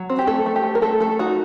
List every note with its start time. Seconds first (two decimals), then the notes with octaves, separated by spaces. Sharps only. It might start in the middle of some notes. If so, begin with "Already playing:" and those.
Already playing: F#3
0.10 C4
0.19 G4
0.27 A3 A4
0.46 A3
0.56 G4
0.64 A3
0.75 A#4
0.82 A3 A4
1.00 A3 A4
1.19 D#4 F#4